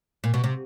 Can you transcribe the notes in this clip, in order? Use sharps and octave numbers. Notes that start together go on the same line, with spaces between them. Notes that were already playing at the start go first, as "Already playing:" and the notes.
A#2
B2
C3